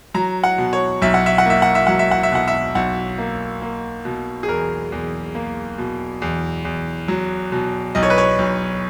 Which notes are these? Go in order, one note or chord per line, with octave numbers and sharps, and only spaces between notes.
F#3 A#5
F#5
B2
C#5
B1 E5
F#5
E5
F#5
A#3 E5
F#5
E5
F#3 F#5
E5
F#5
E5
B2 F#5
E5
B1 F#5
A#3
A#3
B2
G#4
E2 A#4
E2
A#3
B2
E2
E2
F#3
B2
B1 D#5
C#5
B4
C#5
B1